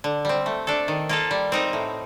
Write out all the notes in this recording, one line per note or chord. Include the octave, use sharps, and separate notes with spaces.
D3
G3 C4
A3
D4 A4
D#3
A#3 F4 A4
G3
C4 D#4 A#4
A2